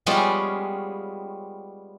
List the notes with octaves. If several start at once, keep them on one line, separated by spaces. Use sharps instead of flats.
G3 G#3 B3 C#4 F4 G4